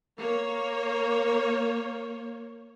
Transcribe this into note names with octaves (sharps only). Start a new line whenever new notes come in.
A#3 C#5